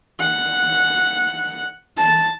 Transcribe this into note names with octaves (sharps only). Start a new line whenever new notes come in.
F#5
A5